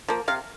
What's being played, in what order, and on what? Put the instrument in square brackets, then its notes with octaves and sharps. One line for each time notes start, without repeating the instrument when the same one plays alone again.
[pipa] F3 A#3
C3 F5